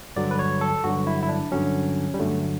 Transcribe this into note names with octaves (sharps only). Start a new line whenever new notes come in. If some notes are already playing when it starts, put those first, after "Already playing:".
G2 D3 F#3 D5
B4
C#5
A4
G2 D3 F#3 F#4
E4
E4
D4
G2 D3 F#3 C#4
G3
G2 D3 F#3 A3